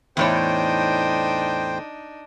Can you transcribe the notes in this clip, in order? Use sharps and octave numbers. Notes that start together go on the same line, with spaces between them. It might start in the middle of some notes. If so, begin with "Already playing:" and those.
E2 A2 D4 D#4 C5 C#5 G5